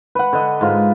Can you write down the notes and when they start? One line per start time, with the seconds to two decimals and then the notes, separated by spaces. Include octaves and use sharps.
0.15 B4 F#5
0.33 D3 D#5
0.61 G#2 F4